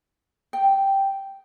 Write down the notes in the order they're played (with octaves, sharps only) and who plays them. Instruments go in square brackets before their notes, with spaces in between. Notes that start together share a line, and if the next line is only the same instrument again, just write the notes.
[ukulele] G5